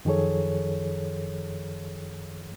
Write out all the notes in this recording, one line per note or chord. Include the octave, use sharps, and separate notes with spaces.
F#2 D#3 F3 G#4 A4 C#5